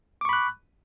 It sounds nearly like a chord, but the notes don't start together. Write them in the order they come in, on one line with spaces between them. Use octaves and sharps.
D6 C#6 B5 F#6